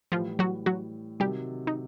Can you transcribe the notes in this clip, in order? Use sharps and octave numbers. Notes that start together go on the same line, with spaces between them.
A2 E3 F3 G3 F4
F#3 F#4
F#3 F#4
C3 D#3 F#3 G3 G4
D#4